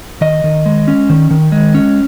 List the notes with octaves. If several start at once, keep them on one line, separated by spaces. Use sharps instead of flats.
D#3 D#5
D#3
G#3
C#4
D#3
D#3
G#3
C#4